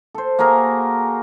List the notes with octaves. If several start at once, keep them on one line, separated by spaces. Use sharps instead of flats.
A4 C5
A#3 F#4 G#4 A#4